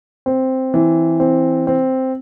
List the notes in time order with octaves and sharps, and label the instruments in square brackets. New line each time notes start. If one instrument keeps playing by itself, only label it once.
[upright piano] C4
E3
C4
C4